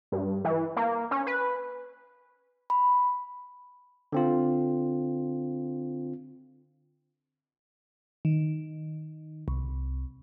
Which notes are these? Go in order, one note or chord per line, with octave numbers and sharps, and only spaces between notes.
G2
E3
A#3
C#4
B4
B5
D3 C4 F4
D#3
C2